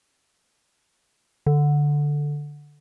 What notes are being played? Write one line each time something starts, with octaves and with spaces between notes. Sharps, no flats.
D3